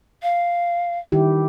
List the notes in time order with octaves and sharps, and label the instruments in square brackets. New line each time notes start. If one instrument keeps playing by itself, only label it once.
[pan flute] F5
[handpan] D#3 E4 G4